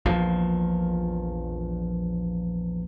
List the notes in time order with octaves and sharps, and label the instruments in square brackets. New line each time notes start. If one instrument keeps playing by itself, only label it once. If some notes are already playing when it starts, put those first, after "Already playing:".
[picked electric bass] A#1 E2 A#2 F3